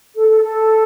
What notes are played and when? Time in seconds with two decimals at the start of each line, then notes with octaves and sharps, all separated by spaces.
0.15 A4
0.29 A4
0.43 A4